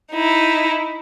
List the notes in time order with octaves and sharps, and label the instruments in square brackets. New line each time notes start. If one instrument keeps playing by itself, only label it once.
[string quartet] D#4 E4